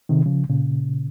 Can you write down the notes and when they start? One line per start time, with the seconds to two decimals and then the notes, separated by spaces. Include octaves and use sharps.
0.09 C3 D#3
0.26 C#3 F3
0.49 A#2 C#3